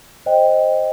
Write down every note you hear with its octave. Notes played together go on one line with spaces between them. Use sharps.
C5 D#5 G5